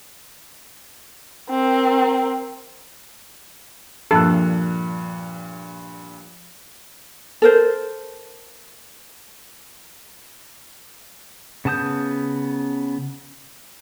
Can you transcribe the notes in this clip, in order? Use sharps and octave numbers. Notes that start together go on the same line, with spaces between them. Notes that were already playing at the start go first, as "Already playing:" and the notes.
C4 A#4
G2 A#2 F3 A4 F#6
A4 A#4 C5
C#3 B3 A5 D#6 G6